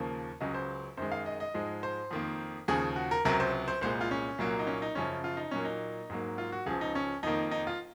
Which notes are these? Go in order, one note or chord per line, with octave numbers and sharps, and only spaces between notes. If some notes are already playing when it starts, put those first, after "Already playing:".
Already playing: D#2 C#3 F3 A#3
C#2 C#3 F#3 D#5
C5
F#2 D#3 G#3 C5
F5
D#5
D#5
G#2 F3 G#3
C5
F2 D#3 A#3
D#2 C#3 F3 G#4
F#4
A#4
C#2 C3 F#3 A#4
C5
C5
C2 A#2 G#3 C5
F4
C#4
C2 A#2 F#3 A#3
D#4
C#4
D#4
F#2 C#3 F3 C#4
F4
D#4
A#2 F#3 A#3 C#4
D#4
G#2 F#3 A#3
F4
F#4
C#2 C#3 F3 G#4
D#4
C#4
F2 D#3 A#3 D#4
D#4
F4